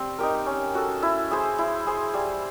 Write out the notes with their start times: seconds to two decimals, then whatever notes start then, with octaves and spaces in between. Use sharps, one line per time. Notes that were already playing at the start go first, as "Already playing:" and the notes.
Already playing: G3 C4
0.18 D#4 G4 A#4
0.46 C#4
0.75 F#4 A4
1.02 E4
1.31 G#4 C5
1.58 E4
1.87 G#4 C5
2.14 G3